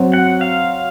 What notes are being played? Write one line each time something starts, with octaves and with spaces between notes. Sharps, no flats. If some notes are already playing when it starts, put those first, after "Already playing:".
Already playing: F#3 C4 F#4
F#5
F5